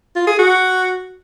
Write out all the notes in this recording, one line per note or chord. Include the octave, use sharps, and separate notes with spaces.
F4
G#4
F#4